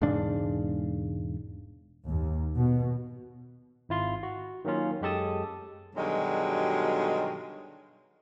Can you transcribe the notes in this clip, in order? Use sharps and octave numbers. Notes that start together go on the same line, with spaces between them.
E1 G#2 C#3 D4
D#2
B2
G#1 E4 F4 C6
F#4
D#3 F#3 A#3 C#4 F4
F#2 G#3 G4 A4 A5 D#6
G2 B2 D3 D#3 F#3 G#3